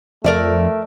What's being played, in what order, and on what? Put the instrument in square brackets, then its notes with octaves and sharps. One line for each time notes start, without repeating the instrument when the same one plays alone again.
[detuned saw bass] F2 [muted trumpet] A3 [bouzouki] A#4 D5 E5